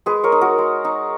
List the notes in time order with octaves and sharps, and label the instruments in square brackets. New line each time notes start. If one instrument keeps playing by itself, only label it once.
[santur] G#3 G#4 B4
A#4 C#5
D#4
F#4 A#4
G#3
D#4